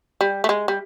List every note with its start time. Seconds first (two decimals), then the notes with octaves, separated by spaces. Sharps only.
0.21 G3
0.44 A3
0.49 G#3
0.68 G3